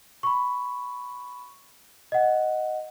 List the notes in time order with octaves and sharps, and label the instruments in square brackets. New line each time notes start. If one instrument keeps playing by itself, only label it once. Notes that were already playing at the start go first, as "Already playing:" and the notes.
[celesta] B5 C#6
D#5 F#5